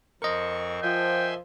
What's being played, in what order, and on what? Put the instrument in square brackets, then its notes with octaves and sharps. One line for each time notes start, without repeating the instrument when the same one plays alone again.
[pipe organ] F2 C4 C#6 [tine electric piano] A#4 D#5
[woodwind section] F3 [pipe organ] E5 G#5 C6 [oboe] G5